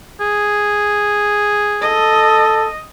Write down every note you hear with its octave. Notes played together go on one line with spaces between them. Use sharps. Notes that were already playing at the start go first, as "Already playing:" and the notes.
G#4
A4 D#5